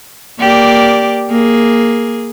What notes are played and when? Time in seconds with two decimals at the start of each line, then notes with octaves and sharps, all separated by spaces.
0.39 A#3 G4 D5
1.30 A#3 G#4